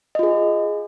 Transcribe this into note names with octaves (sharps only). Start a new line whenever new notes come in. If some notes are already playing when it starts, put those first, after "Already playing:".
F4 G#4 D#5